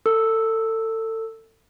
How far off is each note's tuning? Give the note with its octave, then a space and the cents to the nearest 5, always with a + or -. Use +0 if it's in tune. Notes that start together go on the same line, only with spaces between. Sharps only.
A4 +30 E6 +0